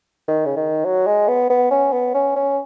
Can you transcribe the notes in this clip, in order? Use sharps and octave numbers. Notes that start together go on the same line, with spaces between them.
D#3
C#3
D#3
F#3
G#3
B3
B3
C#4
B3
C#4
C#4